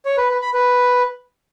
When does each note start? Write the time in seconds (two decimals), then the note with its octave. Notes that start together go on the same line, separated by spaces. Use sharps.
0.06 C#5
0.18 B4
0.30 B4
0.41 B5
0.53 B4